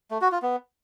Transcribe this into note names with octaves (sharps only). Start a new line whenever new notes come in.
A3
F#4
F4
B3